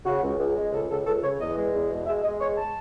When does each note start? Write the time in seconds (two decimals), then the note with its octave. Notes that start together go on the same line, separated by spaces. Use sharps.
0.05 C#3 F#4
0.23 C#2
0.39 C#2
0.56 G#3
0.73 C#2 A4
0.90 C#2 A4
1.06 C#2 A4
1.23 C#3 C#5
1.39 E2 D#5
1.56 G#3
1.74 E2
1.91 B2
2.07 G#3 E5
2.23 G#3 D#5
2.41 E2 C#5
2.57 A5